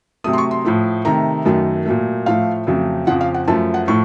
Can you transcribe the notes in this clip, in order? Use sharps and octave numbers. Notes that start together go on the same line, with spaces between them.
C3 F#3 A3 D#6
C6
C#6
C6
A2 F3 A3
C3 D#3 A3 A#5
F#2 D#3 F#3 A3
A#2 F#3 A3
A2 F3 A3 F5
F2 C#3 F#3 A3
F2 C#3 F3 F#5
F5
F#5
F#2 F3 A3 A5
F#5
A2 F3 A3 C#6